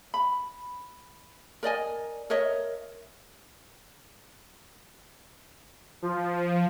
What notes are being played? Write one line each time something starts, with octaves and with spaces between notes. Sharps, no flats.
B5
A#4 D5 D#5 G#5
A#4 C#5 D#5 E5
F3